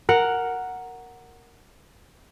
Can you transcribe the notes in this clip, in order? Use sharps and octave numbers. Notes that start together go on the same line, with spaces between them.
A#4 F#5